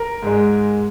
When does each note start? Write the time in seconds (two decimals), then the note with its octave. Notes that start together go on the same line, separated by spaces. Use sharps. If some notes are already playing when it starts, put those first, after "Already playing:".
Already playing: A#4
0.23 G#2 G#3